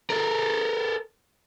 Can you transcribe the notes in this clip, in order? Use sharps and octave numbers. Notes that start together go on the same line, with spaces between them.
A4 A#4